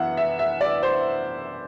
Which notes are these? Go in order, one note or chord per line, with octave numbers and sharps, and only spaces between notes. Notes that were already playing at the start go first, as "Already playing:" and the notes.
Already playing: F#2 E3 B3 E5 F#5
E5
E5
D5
C5